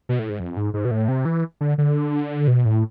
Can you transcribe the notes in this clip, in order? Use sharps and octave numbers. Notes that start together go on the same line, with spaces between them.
B2
A2
G#2
F2
G#2
G#2
B2
A2
C3
E3
D3
D3
B2
A2